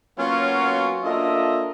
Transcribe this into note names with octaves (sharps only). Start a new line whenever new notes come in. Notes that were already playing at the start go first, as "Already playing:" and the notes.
F#3 A#3 B3 C#4 F4 F#4
A#3 D4 F4 A4 D#5 E5